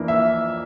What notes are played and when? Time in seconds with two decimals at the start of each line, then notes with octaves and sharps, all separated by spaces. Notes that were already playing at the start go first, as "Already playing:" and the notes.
Already playing: F2 E3 A#3 D4
0.08 E5